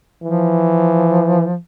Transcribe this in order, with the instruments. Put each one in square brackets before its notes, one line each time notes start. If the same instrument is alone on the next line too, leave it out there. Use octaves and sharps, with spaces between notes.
[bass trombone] E3 [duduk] F3